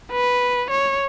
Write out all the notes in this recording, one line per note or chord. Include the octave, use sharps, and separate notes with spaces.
B4
C#5